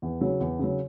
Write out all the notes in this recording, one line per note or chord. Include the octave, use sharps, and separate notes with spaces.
E2
C#3 F#3
E2
C#3 F#3